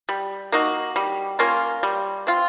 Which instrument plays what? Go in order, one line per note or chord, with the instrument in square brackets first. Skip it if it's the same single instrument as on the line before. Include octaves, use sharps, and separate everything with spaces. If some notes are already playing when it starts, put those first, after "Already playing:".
[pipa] G3
A#3 D#4 F#4
G3
A#3 C#4 F4
G3
C4 F4